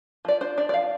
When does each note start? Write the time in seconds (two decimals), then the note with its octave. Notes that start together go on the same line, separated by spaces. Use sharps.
0.25 F3 D5
0.41 D4 C5
0.57 D4 D5
0.69 D5
0.74 F3 F5